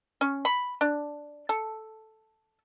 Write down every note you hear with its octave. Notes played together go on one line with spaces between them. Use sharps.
C#4
B5
D4
A4